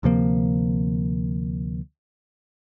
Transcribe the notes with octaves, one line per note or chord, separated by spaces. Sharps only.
D2 C3 F3 A#3